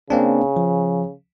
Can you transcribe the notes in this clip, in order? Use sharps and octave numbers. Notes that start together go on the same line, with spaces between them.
C#3 A#3 C4 D4
F3